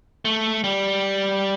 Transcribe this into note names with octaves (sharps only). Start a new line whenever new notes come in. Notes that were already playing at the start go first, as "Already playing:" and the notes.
A3
G3